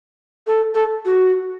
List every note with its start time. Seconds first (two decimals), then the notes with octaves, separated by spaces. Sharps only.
0.47 A4
0.74 A4
1.05 F#4